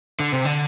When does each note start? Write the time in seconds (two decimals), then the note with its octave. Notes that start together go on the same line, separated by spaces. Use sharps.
0.20 D3
0.33 C3
0.45 D3